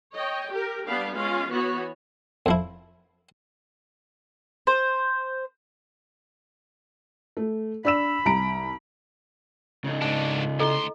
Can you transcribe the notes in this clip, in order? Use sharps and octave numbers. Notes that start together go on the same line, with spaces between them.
C#5 D#5 G5
G4 A#4
G3 B3 D4 G4 F5
G#3 C#4 F4 F5
E3 B3 F#4 C#5
F2 F3 E4
C5
A3
D4 B5 E6 E7
C2 A#5 D7
C#3 D#4
G#2 D4 A5
D2 E4 A4 D#5 C6